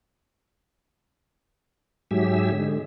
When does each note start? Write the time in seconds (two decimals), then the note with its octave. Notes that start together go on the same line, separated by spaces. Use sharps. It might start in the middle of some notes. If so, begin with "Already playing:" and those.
2.11 G#2 F#3 G4 G#4 E5 E6
2.52 D3 G#3